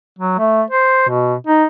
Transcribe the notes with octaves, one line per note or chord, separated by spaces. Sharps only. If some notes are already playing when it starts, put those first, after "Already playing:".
F#3
A3
C5
B2
D#4